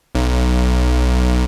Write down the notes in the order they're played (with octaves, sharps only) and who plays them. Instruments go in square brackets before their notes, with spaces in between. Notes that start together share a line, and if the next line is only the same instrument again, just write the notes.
[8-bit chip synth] B1